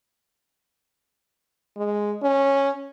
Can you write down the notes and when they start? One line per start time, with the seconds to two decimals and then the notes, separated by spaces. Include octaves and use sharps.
1.77 G#3
2.22 C#4